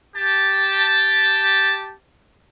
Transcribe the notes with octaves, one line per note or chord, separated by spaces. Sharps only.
G4 A5